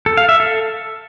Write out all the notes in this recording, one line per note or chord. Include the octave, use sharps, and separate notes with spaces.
A4
F5
E5
A4